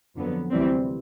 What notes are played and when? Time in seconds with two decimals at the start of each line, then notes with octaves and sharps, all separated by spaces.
0.15 F2 D3 F#3 B3
0.51 D2 C3 E3 G3 C4